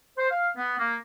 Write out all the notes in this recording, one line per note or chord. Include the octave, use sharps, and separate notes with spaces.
C5
F5
B3
A#3